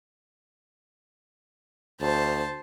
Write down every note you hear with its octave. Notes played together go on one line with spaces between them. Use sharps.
D2 C5 A5